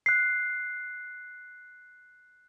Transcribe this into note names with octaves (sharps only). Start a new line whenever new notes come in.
F#6 C7